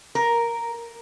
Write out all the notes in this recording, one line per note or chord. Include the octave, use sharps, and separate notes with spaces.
A#4